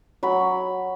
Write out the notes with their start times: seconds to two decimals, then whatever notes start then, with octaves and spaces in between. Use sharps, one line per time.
0.23 F#3 B5